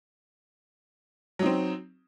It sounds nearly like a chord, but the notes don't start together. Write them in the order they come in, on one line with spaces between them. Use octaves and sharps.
F#3 D#4 C4